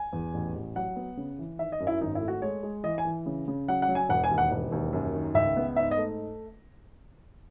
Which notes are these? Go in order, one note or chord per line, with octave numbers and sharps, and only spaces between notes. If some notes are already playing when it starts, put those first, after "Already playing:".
Already playing: G#5
E2
A1
A1
F#3 F#5
B3
C#3
E3
D#3 E5
D#5
F#2
E4
G#1 D#4
E4
A3
F#4
G#3 C#5
G#3
E3 D#5
G#5
E3
C#3
C#3
F#3 F#5
F#5
F#3
G#5
E1 F#5
G#5
D#2
F#5
E1
D#2
F#2
D#3
C#2 E5
B3
G#2 E5
D#5
A3